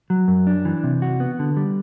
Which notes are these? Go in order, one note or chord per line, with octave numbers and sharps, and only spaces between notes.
F#3
F#2
D4
E3
C3
F#4
B3
D3
G3